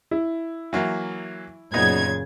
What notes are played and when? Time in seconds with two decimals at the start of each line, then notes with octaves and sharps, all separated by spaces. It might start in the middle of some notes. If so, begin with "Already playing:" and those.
0.11 E4
0.73 E3 F#3 A#3
1.74 F#2 A#2 C#3 B3 D#4 G#6